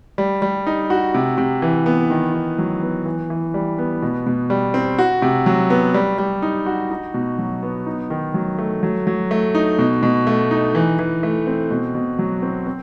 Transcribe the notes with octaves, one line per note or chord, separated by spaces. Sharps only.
G3
G3
D#4
F#4
C3
C3
E3
B3
D#3
D#3
F#3
B3
E3
E3
G3
B3
B2
B2
G3
C4
F#4
C3
F#3
B3
G3
G3
D#4
F#4
D#4
B2
F#3
B3
D#4
D#3
F#3
A3
F#3
F#3
A3
D#4
B2
B2
A3
D#4
E3
E3
A3
C4
B2
B2
F#3
C4
C4